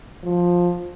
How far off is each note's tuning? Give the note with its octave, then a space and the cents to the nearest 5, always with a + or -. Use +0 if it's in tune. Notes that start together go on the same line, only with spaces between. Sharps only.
F3 +10